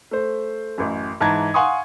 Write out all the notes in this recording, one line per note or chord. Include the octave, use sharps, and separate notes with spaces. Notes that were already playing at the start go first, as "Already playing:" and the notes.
A3 C5
A1 F#2
G#2 E3 A5 A#5 G#6
F5 F#5 G#5 C6 C#6 D#6